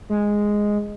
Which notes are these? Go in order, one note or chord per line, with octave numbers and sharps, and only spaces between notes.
G#3